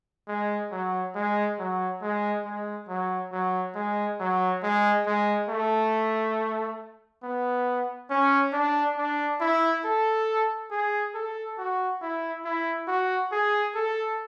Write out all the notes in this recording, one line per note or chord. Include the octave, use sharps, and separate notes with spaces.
G#3
F#3
G#3
F#3
G#3
G#3
F#3
F#3
G#3
F#3
G#3
G#3
A3
B3
C#4
D4
D4
E4
A4
G#4
A4
F#4
E4
E4
F#4
G#4
A4